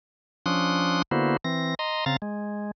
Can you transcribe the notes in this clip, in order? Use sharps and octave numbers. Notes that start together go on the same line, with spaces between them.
F3 C#4 D4 C6 D#6 F#6
D3 A#3 B3 E4 F#4 C5
E3 C4 A#6
D#5 A#5 C6
C#3 C4 F5 A#5 A6
G#3